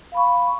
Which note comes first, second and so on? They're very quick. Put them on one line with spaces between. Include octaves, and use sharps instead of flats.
F5 B5 C#6